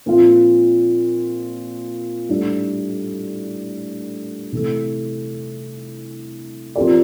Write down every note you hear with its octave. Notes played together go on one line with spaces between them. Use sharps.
A#2 F3 C4 F4
A2 G3 D4
C3 E3 A3
F3 C4 G4 A#4 D5